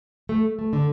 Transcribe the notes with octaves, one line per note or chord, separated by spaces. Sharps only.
A3
A3
D3